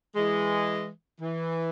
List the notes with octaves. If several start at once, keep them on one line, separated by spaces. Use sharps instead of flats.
E3 G#3
E3